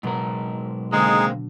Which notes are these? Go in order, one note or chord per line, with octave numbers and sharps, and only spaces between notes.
G#2 B2 F#3 A#4
D3 G#3 A#3 C4 D#4 G#4